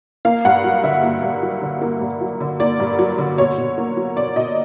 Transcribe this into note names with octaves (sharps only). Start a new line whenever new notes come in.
A#3 F5
G2 F#5
F#3
D3 E5
A#3
G2
F#3
D3
A#3
G2
F#3
D3
A#3 D5
G2
F#3
D3
B2 C#5
B2
A#3
F#3
B2 D5
B2 D#5